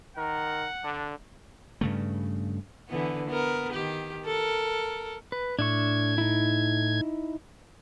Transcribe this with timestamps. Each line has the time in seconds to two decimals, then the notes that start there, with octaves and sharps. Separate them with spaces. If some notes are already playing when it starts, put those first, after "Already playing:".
0.17 D#3 A#4 F#5
0.84 D3 D4
1.81 G2 C#3 A3
2.88 D3 E3 B3
3.27 B3 A#4
3.72 D#3 G4
4.25 A4 A#4
5.32 B4
5.59 A2 D4 E5 C#6 G#6
6.18 D#4 E4